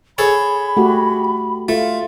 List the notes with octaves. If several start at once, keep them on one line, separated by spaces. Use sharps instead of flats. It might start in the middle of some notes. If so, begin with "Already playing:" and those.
G#4 A4 C#5 B5
A3 F#4 G4
A3 F4